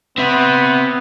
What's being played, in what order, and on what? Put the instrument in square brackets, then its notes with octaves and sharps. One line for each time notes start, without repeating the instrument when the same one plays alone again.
[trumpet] B3 [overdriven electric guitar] C4 E5